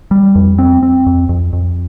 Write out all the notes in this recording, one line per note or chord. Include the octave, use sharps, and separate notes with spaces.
G3
F2
C4
C4
F2
F2
F2